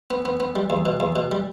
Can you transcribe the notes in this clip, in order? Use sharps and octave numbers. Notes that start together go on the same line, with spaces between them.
B3
B3
B3
G3
E2
B2
E2
B2
G3